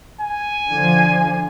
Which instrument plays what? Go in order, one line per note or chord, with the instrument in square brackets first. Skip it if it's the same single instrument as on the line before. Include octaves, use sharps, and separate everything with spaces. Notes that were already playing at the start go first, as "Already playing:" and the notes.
[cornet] G#5
[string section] D3 F3